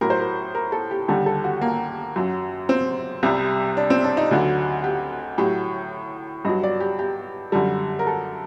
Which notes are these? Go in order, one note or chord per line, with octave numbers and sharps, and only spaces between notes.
A2 F#3 A#4
C5
A#4
A#4
A4
G4
D#2 D3 G3 A4
A4
F#4
A#3
F#2 F#3
C4
C2 C3 G3
D4
C4
D4
D#4
D2 D3 F#3
G4
A2 F#3 G4
G2 F#3 D#5
D5
G4
G4
F#2 D3 G3 A4
A#4
A4